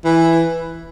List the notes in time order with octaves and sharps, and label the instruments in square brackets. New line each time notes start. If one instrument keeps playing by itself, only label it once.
[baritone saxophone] E3